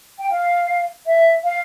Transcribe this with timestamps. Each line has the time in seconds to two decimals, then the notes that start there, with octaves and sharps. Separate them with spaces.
0.19 G5
0.31 F5
1.06 E5
1.44 F5